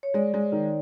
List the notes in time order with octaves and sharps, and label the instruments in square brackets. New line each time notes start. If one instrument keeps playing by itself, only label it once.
[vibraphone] C#5
[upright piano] G#3 [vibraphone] D5
[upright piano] G#3
D#3